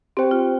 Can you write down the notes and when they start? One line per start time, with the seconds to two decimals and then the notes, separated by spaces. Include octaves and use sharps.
0.17 C4 G4 C5 G5
0.31 F4